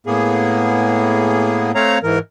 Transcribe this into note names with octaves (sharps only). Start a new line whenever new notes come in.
A2 A#3 B3 G#4
A3 C4 C#5 F5 A#5
G#2 E3 A#4